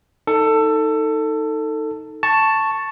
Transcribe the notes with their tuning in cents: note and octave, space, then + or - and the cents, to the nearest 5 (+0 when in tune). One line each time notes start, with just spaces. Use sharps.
D#4 +10 A4 +20
A5 +5 C#6 +0